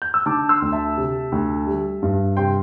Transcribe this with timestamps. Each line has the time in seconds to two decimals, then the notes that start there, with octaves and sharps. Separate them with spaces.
0.02 G6
0.14 E6
0.26 D3 A5 D6
0.49 C6 E6
0.62 D2
0.72 E5 A5
0.97 C3
1.32 D2
1.67 G3
2.03 G2
2.37 C3 G5 C6